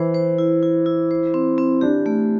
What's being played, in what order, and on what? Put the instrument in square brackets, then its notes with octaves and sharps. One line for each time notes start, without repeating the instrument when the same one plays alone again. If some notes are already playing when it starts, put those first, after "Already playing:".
Already playing: [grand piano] E3 [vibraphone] E4 C5
[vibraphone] C5
E4
E4
E4
C5
C4
C4
[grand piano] D4 [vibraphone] G4
[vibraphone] A3